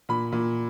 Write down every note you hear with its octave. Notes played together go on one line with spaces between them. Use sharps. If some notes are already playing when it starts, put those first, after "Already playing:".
A#2 B5
A#2